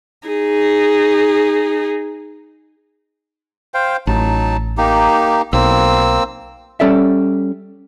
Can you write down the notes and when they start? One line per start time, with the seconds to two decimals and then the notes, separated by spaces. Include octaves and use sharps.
0.28 D#4 G#4
3.74 C5 F5 G5
4.07 A1 F#3 D#4 A5
4.78 A#3 D#4 G4
5.53 B1 A#3 C4 E6
6.80 G3 C#4 A4 D5 E5